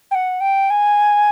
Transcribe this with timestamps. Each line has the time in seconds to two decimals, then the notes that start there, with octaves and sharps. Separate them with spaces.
0.11 G5
0.15 F#5
0.40 G5
0.70 G#5